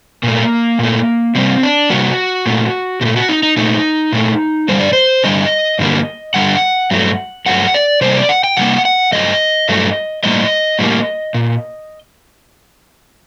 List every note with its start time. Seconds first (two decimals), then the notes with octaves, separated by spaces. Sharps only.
0.23 A#2 A3 A#3
0.79 A#2 A3
1.35 C3 G3 A#3 C4
1.63 D4
1.90 C3 G3 A#3 F#4
2.46 A#2 A3
3.01 A#2 G4
3.05 A3
3.16 F#4
3.29 D#4
3.43 D#4
3.57 A#2 A3 D#4
4.13 A#2 A3
4.68 G2 D3 G3 C5
4.80 D5
4.93 C5
5.24 G2 D3 G3 D#5
5.79 G2 D3 G3 A#3
6.34 G2 D3 G3 F#5
6.91 G2 F#3 A3
7.46 G2 F#3 A3 F#5
7.74 D5
8.01 C3 G3 A#3 C5
8.10 D#5
8.16 D5
8.29 F#5
8.44 G5
8.57 C3 G3 A#3 F#5
8.85 F#5
9.12 G2 F#3 A3 D#5
9.69 G2 F#3 A3
10.24 A2 G3 A#3 D#5
10.79 A2 G3 A#3
11.34 A#2